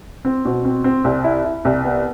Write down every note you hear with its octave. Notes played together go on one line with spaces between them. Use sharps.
C4
B2
C4
C4
C2
E4
E4
C2
B3